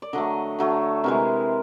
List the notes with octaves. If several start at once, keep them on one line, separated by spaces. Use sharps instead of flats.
D5
D3 F#3 A3 D#5
D3 F#3 A3
C3 E3 G#3 A#4